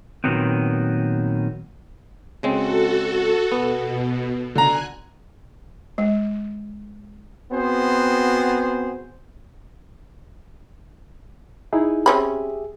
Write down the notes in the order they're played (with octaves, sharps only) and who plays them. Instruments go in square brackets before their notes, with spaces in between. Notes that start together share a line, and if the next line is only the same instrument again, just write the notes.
[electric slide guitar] A#2 D#3 F#3 B3 C4
[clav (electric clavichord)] C#3 G#3 C4 [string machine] F#4 A4
[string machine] B2 [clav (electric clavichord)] B3
[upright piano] D3 A#5 [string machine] G#5 F#6
[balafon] G#3
[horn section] B3 C4 F#4 G#4 C5
[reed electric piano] D#4 E4 G#4
[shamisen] C4 C#4 B5 [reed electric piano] G4 G#4 E5